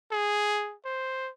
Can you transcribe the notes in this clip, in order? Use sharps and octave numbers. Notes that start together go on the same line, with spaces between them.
G#4
C5